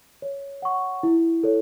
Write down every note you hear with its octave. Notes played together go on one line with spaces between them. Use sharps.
C#5
F#5 C#6
E4
A4 C#5